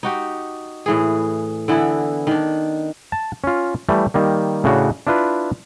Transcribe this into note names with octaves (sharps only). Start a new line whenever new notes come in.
D#4 F#4 G4
A2 E3 G#4
D3 E3 B3 E4
D#3 D4
A5
C#4 F4
E3 G3 A3
D#3 G3 A#3
A2 C#3 D4 F#4
D4 E4 F4 B4